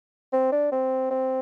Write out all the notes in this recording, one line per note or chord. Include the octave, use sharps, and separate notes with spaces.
C4
D4
C4
C4